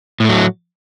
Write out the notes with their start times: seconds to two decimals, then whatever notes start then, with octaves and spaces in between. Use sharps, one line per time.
0.20 A2
0.25 A3
0.29 F#3